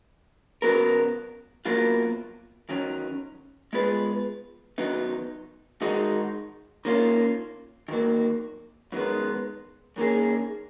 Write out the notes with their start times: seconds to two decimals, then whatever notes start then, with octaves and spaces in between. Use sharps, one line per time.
0.62 C#3 F#3 B3 F#4 A#4
1.65 B2 F#3 A#3 F4 A#4
2.69 D#3 F#3 C#4
3.73 G#3 B3 F4 G#4 B4
4.78 D#3 F#3 B3 D#4
5.82 D#3 G#3 D#4 F#4
6.85 D#3 A#3 C#4 F4
7.88 D#3 F#3 A#3
8.92 F#2 D#3 G#3 B3
9.96 F#2 D#3 A#3 C#4 G#4